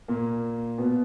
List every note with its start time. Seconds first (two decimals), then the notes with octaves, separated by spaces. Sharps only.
0.08 A#2 A#3
0.78 B2 B3